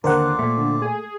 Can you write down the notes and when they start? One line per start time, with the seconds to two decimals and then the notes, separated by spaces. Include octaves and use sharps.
0.04 D#2 D3 C4 F4 A#4 C5 D5 F#5
0.39 A#2 A3
0.57 D3
0.82 G#4